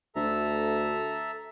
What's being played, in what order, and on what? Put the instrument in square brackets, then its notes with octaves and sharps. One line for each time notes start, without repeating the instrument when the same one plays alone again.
[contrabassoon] D2 [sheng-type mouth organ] A4 E5 A#5